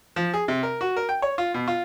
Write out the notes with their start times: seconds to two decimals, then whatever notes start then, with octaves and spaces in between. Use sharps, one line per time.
0.16 F3
0.34 G#4
0.48 C3
0.63 A#4
0.81 F#4
0.97 A#4
1.09 G5
1.22 C#5
1.38 F4
1.54 B2
1.68 F4